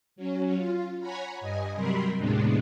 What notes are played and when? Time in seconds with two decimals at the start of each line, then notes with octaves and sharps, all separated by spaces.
0.16 F#3 C#4
0.54 F4
1.00 C#5 F#5 G#5 A#5 B5
1.41 G2 D#5 G#5
1.75 C3 F#3 G3 A#4 B5 C6
2.18 D#2 A2 C3 G#3 B3 D4